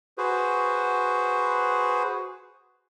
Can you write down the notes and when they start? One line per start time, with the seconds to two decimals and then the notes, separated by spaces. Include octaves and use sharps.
0.18 F#4 G#4 B4 C5